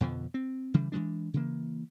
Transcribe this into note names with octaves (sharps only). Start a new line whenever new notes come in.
F2 B2 D3 F3
C4
C#3 E3 G3
E3 F#3 G#3 D4
C#3 E3 A#3